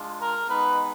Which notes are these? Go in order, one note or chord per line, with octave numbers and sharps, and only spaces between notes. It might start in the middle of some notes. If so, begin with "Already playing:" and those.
Already playing: G#3 D4 F4
A#4
G#3 B3 D#4 B4